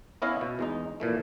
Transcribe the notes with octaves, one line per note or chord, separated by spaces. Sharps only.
B3 C#4 E4 C#5 D#5 F5
B2
E2 G#3 D#4
A#2 E3 A3